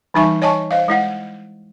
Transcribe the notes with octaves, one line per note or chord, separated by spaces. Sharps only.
E3 G3 D#4 E5 G#5 C#6
C#5 D#5 G#5 A5 C#6
C5 D#5 F5
G#3 E4 F#5